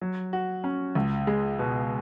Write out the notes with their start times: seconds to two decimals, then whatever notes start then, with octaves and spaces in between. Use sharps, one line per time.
0.01 F#3
0.33 F#4
0.64 C#4
0.95 C#2
1.27 G#3
1.59 B2